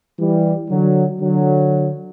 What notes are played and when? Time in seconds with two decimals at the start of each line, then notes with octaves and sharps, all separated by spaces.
0.20 E3 G3
0.70 D3 F#3
1.20 D3 F#3